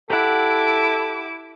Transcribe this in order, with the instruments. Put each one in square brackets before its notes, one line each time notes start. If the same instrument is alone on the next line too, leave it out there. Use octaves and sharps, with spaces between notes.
[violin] E4 D6 [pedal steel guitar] G4 F#5 [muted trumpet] A4